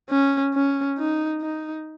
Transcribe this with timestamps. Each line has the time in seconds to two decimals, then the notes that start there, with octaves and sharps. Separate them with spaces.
0.10 C#4
0.54 C#4
0.98 D#4
1.42 D#4